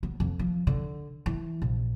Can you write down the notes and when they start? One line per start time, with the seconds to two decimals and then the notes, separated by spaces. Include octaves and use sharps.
0.03 B3
0.20 F2
0.39 F3
0.67 D3
1.26 E3
1.62 A#1